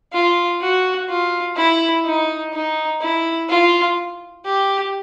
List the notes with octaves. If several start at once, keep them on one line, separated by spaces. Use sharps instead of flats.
F4
F#4
F4
E4
D#4
D#4
E4
F4
G4